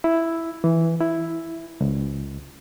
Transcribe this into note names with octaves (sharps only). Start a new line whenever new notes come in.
E4
E3
E4
C#2